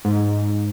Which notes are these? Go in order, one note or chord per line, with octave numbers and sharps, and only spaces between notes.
G#2